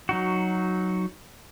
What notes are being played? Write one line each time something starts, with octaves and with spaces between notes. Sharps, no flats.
F#3 D#4 F#4